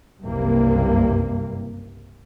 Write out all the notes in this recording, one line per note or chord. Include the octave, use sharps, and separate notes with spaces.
F#1 C2 G2 C3 A#3